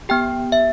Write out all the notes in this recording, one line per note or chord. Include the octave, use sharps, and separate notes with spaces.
B3 G4 G5
E5